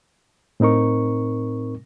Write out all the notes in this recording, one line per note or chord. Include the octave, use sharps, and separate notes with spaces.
A2 C4 D#4 A#4 C#6